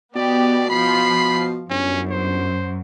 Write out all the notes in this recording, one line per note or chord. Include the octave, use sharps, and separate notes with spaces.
B2 B3 G4 D5
F3 B5 C7
G1 F#2 C#4
C5